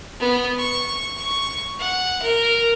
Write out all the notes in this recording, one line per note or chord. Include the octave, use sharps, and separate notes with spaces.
B3
C#6
C#6
F#5
A#4